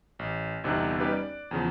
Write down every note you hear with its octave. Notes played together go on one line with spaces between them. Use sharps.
A1
G1 E2 C3 D4 D#4 F#6
G3 C#4 D#4 G4 B4
D5
E2 C#3 F3